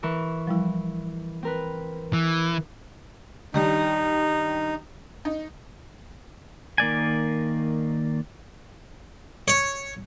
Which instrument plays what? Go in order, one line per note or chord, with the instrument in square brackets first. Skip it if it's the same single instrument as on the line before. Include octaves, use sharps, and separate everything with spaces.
[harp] E3 A#4 C#6
[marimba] F3 G3 E4
[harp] C4 A#4 B4
[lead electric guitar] E3
[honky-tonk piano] D#3 G3 D4 [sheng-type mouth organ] D#4
[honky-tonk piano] D#4
[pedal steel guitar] D#3 A#3 D5 G#5
[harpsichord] C#5